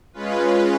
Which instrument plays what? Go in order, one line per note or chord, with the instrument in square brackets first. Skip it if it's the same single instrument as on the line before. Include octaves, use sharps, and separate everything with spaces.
[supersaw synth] G#3 C#4 F4 B4